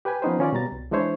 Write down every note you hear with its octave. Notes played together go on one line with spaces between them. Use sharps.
G4 B4 G5 G#5
F3 B3 C#4 D#4 B4 C5
D#3 C#4 F4 D5
B2 G3 A#5 A6
C2
E3 G#3 D4 E4 C5 C#5